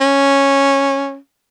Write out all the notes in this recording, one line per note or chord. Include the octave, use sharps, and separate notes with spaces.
C#4